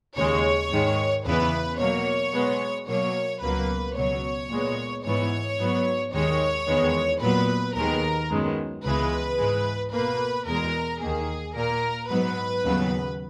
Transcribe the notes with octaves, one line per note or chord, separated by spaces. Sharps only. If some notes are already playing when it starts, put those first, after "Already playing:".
D#2 C#3 G#3 C#5
G#2 D#3 G#3
E2 C#3 E3 B3 B4
B2 F#3 A#3 C#5
B2 G#3 B3
B2 F#3 A#3 C#5
C#2 B2 F#3 A#3 B4
C#2 B2 F#3 C#5
A#2 G#3 B3
G#2 E3 B3 C#5
G#2 F#3 B3
D#2 D#3 G#3 C#5
E2 D#3 G#3 B3
A#2 F#3 B3 B4
D#2 D#3 G#3 B3 A#4
F#2 D#3 G#3 B3
C#2 C#3 E3 G#3 B3 B4
G#2 E3 G#3
B2 A#3 B4
E2 B2 G#3 A#4
D#2 D#3 A#3 G#4
A#2 A#3 A#4
G#2 F#3 B3 B4
D#2 C#3 F#3 B3